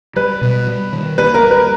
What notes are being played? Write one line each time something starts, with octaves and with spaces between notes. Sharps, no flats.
G3 B4
B2
G3
D#3
A#3 B4
A#4
G3
B4